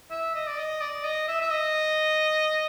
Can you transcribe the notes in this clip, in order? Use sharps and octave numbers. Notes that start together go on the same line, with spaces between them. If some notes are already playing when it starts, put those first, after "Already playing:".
E5
D#5
D5
D#5
D5
D#5
E5
E5
D#5